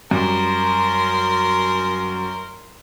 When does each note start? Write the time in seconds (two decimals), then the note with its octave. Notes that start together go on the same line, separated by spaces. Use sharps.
0.11 F#2 G3 A#4 C6